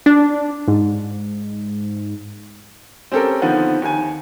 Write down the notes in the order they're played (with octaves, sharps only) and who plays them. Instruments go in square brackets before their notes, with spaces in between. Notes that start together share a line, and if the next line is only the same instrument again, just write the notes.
[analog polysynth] D4
G#2
[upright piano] C4 C#4 G4 A4 A#4
D3 D#3 F3 B3 C4
D#2 D#3 G#5